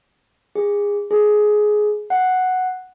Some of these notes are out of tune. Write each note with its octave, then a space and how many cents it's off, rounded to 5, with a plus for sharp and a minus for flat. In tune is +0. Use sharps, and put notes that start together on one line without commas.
G#4 -25
G#4 +15
F#5 +0